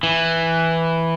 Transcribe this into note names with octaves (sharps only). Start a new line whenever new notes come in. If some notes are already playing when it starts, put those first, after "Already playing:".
E3